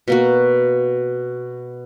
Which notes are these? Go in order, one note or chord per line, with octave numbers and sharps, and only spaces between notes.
B2 A#3 F#4